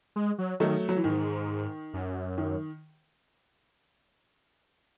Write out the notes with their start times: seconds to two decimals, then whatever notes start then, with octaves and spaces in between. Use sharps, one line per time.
0.16 G#3
0.38 F#3
0.60 D#3 F#3 A3
0.89 F#3
0.97 E3
1.04 G#2 D#3
1.93 F#2
2.38 D#3